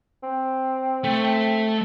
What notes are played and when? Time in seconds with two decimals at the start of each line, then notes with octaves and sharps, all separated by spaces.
0.23 C4
1.04 A3